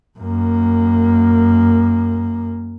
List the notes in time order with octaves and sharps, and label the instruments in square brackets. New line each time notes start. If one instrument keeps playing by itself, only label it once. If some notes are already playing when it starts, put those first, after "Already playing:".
[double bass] F#2 A#3